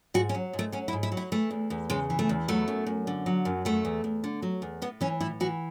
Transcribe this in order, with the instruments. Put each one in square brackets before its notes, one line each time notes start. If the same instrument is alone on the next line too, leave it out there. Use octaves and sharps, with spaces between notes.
[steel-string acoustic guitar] G#2 F#4
C#4
F#3
G#2
A3
F#3 C#4
E4
G#2
E4
F#3
E4
E3 A3
E2
E2
C#3 G#3
E3
A3
E2
F#3 A3
F#2
F#2
D3
F#3
F#2
F#3 A3
E2
E2
D3
F#3
E2
A2 B3
E3 C#4
A2 E4
E3 F#4